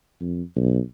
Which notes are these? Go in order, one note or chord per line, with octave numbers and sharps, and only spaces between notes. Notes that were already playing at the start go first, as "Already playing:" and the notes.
F2
B1